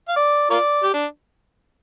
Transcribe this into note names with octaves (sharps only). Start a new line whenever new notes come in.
F5
D5
F4 A#4 D5
G4
D4